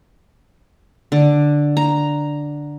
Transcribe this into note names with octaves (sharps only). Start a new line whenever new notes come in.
D3
A#5